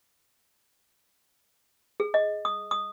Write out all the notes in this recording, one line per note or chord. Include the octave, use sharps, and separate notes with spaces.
G#4
D#5
D#6
D#6